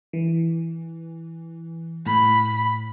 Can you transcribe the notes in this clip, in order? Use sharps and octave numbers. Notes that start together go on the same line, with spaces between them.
E3
A2 B5